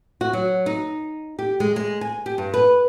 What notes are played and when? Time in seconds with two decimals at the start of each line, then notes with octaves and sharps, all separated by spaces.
0.21 F#4
0.33 F#3
0.66 D#4
1.39 G4
1.60 G#3
1.76 G#3
2.01 G#5
2.26 G4
2.38 G2
2.54 B4